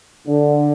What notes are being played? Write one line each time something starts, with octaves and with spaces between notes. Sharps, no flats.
D3